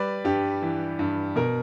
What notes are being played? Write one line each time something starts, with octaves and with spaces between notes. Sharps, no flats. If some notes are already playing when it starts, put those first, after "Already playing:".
Already playing: G3 B4 D5
G2 G4
E3
G2
B2 A#4